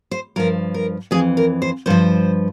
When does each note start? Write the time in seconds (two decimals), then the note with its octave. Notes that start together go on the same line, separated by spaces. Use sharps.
0.11 C5
0.36 G2 F3 A#4
0.74 A#4
1.11 F2 E3 G#4
1.37 A#4
1.62 C5
1.86 G2 F3 C5